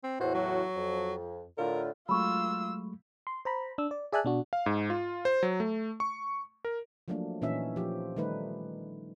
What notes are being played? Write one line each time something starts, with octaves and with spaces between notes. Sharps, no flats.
C4
E2 A2 F#4 C5
F#3
F2
A2 D3 F4 A#4
F#3 G#3 A3 F4 B5 C#6 E6
C6
C5 A#5 B5
D4 E6
D5
G#4 D5 E5 G#5 A5 F#6
B2 D4 F#4
F5
G#2
F4
C5
F#3
A3
C#6
A#4
F3 F#3 A3 A#3 D4
A#2 E3 C#4 D#4 E5
F3 G4
D#3 G3 A3 D#4 B4